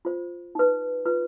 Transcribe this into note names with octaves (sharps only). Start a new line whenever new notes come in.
F4 C5
D#4 B4
F4 B4